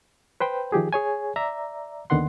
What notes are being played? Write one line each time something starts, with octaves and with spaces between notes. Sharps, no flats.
B4 C5 G5
D#3 F3 G4 G#4
G#4 C#5 G#5
D5 E5 A#5
D#2 D3 D#3 B3 F#5 C6